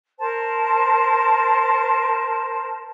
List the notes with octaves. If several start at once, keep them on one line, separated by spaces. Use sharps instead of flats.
A#4 C5 A5